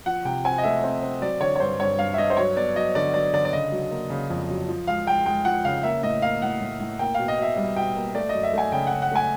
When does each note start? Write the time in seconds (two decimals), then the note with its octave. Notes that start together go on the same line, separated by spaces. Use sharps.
0.06 F3 F#5
0.25 C3 G5
0.45 C4 G#5
0.58 D#5
0.63 A3 E5
0.84 C4
1.03 C4
1.21 F#3 D5
1.40 D3 C#5
1.56 C#5
1.60 G2 C5
1.80 G2 C#5
1.98 G2 F5
2.14 E5
2.18 G2 D#5
2.30 C5
2.37 F#3 C#5
2.56 B3 D5
2.76 F#3 D#5
2.95 D3 D5
3.14 F#3 D5
3.33 D3 D5
3.45 D5
3.53 C#3 D#5
3.72 F#3
3.91 A#3
4.10 C#3
4.30 F2
4.50 F#3
4.69 F3
4.87 G#3 F5
5.07 G#3 G5
5.26 G#3 G5
5.45 F3 F#5
5.65 C#3 F5
5.83 A#3 E5
6.03 A2 D#5
6.22 A#3 F5
6.42 A2 F#5
6.61 A2
6.80 A2
6.99 A#3 G5
7.14 B2 F5
7.28 D#5
7.39 B2 E5
7.57 G3
7.76 B2 G5
7.96 A#3
8.15 A3 D5
8.29 D#5
8.34 F#2
8.43 E5
8.53 A3 G#5
8.72 C#3 G5
8.87 F#5
8.92 C#3
9.02 F#5
9.12 A3 G#5